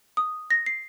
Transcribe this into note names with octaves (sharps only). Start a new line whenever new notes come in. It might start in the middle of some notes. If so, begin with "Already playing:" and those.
D#6
A#6
C7